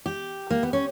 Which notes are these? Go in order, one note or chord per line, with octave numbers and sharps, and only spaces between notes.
G4
A#3
B3
C#4